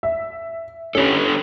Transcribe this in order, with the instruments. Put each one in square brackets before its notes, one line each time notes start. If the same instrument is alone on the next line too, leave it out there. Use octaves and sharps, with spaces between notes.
[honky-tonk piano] E5
[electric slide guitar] D3 G4 A4 [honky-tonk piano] C#4